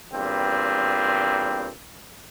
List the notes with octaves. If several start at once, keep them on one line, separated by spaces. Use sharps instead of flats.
E2 G2 A#2 C4